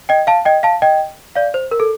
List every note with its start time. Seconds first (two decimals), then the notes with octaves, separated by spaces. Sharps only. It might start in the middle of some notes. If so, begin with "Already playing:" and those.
0.09 D#5 G5
0.27 F5 A5
0.45 D#5 G5
0.63 F5 A5
0.82 D#5 G5
1.35 D5 F5
1.54 C5
1.71 A#4
1.80 A4